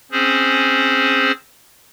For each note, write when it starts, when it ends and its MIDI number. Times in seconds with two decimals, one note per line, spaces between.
0.11 1.32 60
0.11 1.32 61
0.11 1.32 68
0.11 1.32 72